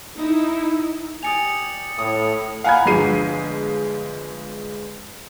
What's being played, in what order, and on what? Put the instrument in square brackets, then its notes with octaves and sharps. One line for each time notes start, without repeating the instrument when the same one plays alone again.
[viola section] D#4 E4
[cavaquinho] G4 D5 G#5 [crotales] D#6 C#7 F7
[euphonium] A2 [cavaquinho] D#6
[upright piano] F5 F#5 G#5 A#5 B5 G#6
G1 F3 G#3 C7 D#7